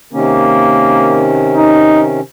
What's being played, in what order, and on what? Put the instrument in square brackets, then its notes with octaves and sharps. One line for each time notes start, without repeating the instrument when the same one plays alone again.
[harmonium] C3 D#3 C#4 [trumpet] A#3
[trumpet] D#4